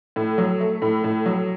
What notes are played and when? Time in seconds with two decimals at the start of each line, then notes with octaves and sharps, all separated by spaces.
0.16 A2
0.38 F#3
0.61 A3
0.82 A2
1.04 A2
1.26 F#3